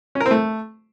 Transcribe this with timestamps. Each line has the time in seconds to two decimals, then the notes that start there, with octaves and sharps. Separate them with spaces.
0.15 C#4
0.20 A#4
0.26 C4
0.31 A3